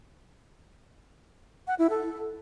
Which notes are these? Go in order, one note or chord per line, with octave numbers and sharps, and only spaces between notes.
F#5
E4
A4